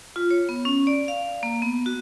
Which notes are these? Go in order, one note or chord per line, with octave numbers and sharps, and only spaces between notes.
F4
C#5
B3
C#4
D5
F5
A#3
B3
F#4